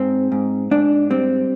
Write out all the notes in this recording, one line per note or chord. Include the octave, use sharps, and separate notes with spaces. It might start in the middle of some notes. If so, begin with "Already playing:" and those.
Already playing: G#2 C4
G#2
G#2 D4
G3 C4